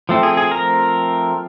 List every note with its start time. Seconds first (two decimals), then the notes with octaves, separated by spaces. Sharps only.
0.09 F3 A3 C4
0.23 G#4
0.37 G#4
0.51 A#4